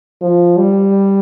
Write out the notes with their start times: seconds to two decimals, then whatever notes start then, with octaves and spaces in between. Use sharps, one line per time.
0.21 F3
0.57 G3